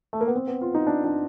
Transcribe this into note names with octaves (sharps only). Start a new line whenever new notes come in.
A3
A#3
B3
C4
B3
F4
D#4
D4
D4